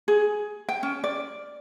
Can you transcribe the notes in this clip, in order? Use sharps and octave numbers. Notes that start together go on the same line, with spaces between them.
G#4
G5
C#4
D5